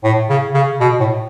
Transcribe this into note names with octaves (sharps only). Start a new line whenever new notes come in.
A2
C#3
C#3
B2
A2